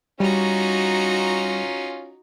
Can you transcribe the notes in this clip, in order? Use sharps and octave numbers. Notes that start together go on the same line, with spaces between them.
G3 C#4 D#4 F4 F#4 A#5